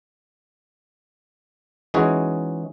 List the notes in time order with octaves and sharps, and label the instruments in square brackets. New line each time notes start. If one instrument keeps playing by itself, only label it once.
[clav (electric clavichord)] E3 G#3 C#4 D#4 F#4 G#4